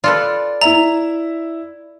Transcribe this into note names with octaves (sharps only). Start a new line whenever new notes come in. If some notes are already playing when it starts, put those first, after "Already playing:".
F4 A4 B4 D5
E4 E5 A#5